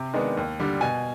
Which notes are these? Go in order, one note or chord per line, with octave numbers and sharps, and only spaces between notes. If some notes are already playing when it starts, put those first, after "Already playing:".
Already playing: C3
D#3 G#3 B3 D4
D#2
D3 G3
B2 G#5